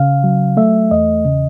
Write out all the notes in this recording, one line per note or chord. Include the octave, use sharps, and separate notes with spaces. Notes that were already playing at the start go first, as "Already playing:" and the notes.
Already playing: C#3 F5
F#3
A3 E5
E2 D#5
C#3